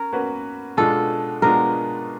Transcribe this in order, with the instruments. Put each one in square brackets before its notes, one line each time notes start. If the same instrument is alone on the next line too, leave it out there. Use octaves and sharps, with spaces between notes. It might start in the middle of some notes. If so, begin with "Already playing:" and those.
Already playing: [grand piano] C#4 [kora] A#4
[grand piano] A#3 C#4 F#4 B4
[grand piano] B2 G#3 B3 D4 F4 [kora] A4
[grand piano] B2 G#3 B3 D4 F4 [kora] A#4